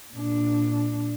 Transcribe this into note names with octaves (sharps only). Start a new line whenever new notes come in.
A#2 D4